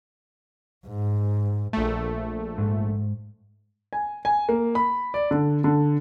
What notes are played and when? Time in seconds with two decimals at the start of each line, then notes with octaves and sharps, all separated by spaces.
0.87 G#2
1.73 A#1 A3
2.58 G#2
3.93 G#5
4.25 G#5
4.49 A#3
4.75 B5
5.14 D5
5.31 D3
5.64 D3